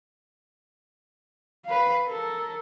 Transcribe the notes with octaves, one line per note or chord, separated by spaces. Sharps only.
B4 F5
A4 A#4